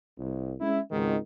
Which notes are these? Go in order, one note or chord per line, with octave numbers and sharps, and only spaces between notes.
C2
G#3 C#4 E4
G#1 C#2 G#2 D#3